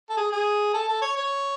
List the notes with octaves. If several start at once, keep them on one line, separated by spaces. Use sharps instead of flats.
A4
G#4
G#4
A4
A4
C#5
C#5